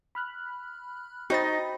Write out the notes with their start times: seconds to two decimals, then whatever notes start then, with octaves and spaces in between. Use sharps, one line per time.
0.15 B5 F6 F#6
1.30 D#4 F#4 C5 D#5 G5 B5 A6